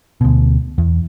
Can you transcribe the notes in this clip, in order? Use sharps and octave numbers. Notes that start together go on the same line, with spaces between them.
D2 B2
E2